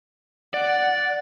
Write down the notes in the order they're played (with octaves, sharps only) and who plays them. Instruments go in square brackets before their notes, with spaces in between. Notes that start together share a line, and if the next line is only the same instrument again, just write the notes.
[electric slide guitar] D5 [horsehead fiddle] F#5